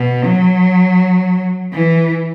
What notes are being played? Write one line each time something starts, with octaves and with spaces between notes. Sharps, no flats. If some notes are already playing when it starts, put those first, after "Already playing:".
Already playing: B2
F#3
E3